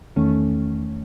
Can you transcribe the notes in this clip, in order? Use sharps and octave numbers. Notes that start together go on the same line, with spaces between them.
E2 D#3 A3 C#4